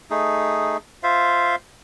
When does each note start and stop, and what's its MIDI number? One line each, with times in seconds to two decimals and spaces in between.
0.10 0.77 57
0.10 0.77 63
0.10 0.77 68
1.03 1.55 65
1.03 1.55 72
1.03 1.55 76
1.03 1.55 77